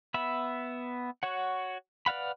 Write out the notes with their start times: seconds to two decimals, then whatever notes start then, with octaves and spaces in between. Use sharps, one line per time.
0.14 B3 E5 B5
1.23 F#4 C#5 F#5
2.06 B4 D5 F5 F#5 B5